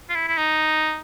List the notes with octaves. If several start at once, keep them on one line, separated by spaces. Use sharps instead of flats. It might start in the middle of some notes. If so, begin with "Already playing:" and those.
F4
E4
E4
D#4